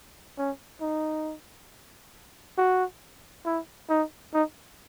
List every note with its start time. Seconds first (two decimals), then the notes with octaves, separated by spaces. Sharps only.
0.38 C#4
0.81 D#4
2.58 F#4
3.45 E4
3.89 D#4
4.34 D#4